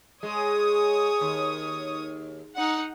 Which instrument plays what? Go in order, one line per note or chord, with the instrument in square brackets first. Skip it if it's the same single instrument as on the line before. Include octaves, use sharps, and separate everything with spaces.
[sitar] G#3 [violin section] C#5 D#6
[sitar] D#2
[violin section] D#4 F#5